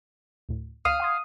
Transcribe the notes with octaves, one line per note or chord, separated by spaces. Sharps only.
D2 A2
D2 F5 D#6
F#5 C6 G#6